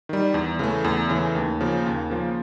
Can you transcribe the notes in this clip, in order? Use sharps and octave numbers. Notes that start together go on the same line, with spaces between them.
D#3 G3
E2
C#3 E3 A3
E2
C#3 E3 A3
D#2
C#3 F3 A#3
D#2
C#3 F3 A#3